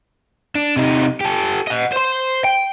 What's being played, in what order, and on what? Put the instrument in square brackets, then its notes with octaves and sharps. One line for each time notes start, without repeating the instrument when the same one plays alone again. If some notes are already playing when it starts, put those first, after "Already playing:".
[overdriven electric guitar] D4
C3 D#4
G4 A4
D#5 F#5
C5 C6
G5